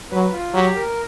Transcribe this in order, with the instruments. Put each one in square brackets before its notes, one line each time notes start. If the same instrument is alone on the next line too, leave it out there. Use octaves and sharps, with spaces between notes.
[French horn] F#3 [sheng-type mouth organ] B4
[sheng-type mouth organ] F4
[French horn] F#3 [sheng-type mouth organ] G4
[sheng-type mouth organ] A#4